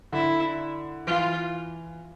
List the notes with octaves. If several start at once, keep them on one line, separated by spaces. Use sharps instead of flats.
D3 E4
E3 F4